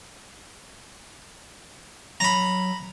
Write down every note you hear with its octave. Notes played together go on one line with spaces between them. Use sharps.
F#3 A#5 B5